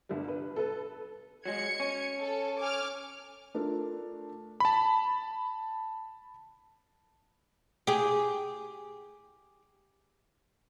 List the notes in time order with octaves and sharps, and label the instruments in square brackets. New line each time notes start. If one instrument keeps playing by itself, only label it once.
[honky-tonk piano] G1 G3
B4
A4 B4
[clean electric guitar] F#3 G#3 [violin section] G#6 C#7
[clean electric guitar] C#4
[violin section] A4
G#5 D6 F6
[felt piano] A3 D4 F4 A4 A#4
[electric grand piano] A5 B5
[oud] G4 G#4